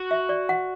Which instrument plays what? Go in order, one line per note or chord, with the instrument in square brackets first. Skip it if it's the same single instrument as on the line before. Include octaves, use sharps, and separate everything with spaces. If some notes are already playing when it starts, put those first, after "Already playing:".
Already playing: [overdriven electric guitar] F#4
[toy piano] E5
D5
F#5